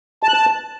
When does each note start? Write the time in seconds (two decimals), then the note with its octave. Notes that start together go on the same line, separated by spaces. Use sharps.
0.23 A5
0.28 F#6
0.34 A5